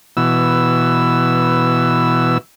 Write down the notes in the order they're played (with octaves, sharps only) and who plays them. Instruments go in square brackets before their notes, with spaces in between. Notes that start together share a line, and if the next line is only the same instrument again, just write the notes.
[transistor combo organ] B2 E3 E6